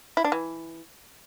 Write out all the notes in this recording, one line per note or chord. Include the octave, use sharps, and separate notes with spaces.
E4
D4
E3